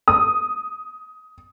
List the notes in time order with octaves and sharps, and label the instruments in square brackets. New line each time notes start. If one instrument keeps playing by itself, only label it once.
[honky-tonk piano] D#6